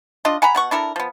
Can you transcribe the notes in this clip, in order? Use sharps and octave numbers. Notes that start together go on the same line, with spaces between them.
D4 F4 D#5
F#5 G#5 A#5 B5
B2 F#5 C#6
D4 E4 A4 A#4
F3 B3